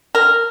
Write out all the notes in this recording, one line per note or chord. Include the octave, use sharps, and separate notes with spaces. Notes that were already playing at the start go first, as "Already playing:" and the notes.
A#4